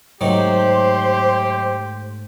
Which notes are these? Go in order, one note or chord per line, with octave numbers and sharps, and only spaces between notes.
G#2 C3 D#3 F#3 A3 G4 C5 C6